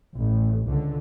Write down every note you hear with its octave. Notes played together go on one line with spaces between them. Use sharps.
A1
C#2 D3